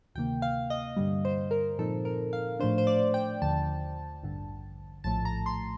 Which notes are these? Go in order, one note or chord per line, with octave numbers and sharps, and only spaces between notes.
D2 C3 D#3 A#3 G5
F5
D#5
G2 D3 G3
C5
A#4
A#2 F3 C4 D#4 A4
A#4
F5
A2 F3 A3 D4 C5
C5
D5
G5
D#2 D3 F3 A5
A1 G2 D3
A#1 A2 F3 A3 A5
A#5
C6